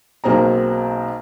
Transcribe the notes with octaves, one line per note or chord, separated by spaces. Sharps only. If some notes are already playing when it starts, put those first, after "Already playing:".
B1 B2 A#3 C4 G#4 A#5